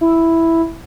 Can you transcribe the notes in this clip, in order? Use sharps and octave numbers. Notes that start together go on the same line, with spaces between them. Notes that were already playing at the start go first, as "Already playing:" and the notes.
E4